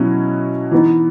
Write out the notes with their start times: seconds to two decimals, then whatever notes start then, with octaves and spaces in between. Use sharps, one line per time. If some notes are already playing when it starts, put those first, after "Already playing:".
Already playing: B2 F#3 C#4 E4
0.71 E3 B3 D#4